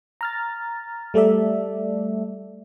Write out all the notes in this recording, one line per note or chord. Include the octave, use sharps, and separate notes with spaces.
A#5 F6 A6
G3 A3 A4 D5 E5